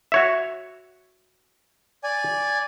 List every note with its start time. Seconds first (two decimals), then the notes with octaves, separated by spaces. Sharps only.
0.12 F#4 C#5 E5
2.04 D5 G#5